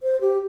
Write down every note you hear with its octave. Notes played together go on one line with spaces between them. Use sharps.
C5
G4